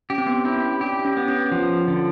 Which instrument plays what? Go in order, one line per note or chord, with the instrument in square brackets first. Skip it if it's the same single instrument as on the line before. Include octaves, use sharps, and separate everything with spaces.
[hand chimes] C#4 [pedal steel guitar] G4
[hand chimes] C4
B3
C4
[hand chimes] C#4 [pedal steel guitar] E4
[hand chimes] D4 [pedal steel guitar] G4
[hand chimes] C#4
[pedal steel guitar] B3
[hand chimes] C#4
[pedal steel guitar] F3
D3